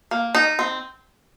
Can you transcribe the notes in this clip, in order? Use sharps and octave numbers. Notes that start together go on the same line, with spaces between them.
A#3
D#4
C4